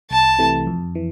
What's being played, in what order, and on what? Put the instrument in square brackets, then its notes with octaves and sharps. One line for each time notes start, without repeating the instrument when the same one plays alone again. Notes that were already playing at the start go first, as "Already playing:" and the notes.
[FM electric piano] C2 [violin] A5
[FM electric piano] C3 E3 A3
F2
E3